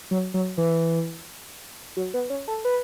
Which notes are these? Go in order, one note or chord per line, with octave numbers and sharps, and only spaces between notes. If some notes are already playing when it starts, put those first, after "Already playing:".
F#3
F#3
E3
F#3
B3
C#4
A4
B4